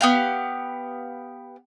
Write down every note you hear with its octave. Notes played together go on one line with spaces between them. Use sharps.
B3 G4 F5